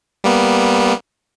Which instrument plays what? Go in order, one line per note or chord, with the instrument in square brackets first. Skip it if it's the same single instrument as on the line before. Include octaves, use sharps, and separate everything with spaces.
[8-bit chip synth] G3 A#3 B3